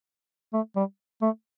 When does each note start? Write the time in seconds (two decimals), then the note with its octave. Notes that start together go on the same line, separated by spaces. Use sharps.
0.53 A3
0.76 G3
1.22 A3